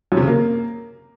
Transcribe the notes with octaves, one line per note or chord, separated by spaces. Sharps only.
F#2
C3
C#3
A#3